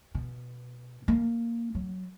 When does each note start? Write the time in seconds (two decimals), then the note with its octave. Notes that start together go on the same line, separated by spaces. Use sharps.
0.15 B2
1.08 A#3
1.75 F#3